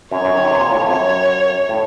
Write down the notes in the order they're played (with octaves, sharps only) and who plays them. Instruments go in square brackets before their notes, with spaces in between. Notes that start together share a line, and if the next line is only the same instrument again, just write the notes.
[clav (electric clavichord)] F#2 [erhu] C#5
[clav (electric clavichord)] F#2
D#3
C3
A#2
A2
F2
[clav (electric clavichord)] F#2 [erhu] C#5
[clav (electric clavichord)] A2